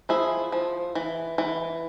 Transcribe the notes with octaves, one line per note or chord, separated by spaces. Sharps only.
F3 E4 G#4
F3
E3
E3